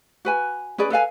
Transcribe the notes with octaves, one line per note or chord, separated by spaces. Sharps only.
F#4 B4 G#5
C#4 G#4 B4 D5
A4 B4 F5 G#5